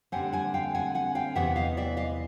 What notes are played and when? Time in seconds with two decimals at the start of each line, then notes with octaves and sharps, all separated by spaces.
0.12 D3 G3 C4 F#5 G#5
0.33 F#5 G#5
0.54 F5 G5
0.75 F#5 G#5
0.95 F#5 G#5
1.15 F5 G5
1.35 E2 C3 E3 B3 E5 F#5
1.56 D#5 F5
1.77 D5 E5
1.97 D#5 F5